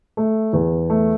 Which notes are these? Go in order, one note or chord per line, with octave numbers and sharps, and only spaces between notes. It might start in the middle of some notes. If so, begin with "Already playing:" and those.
A3
E2
A3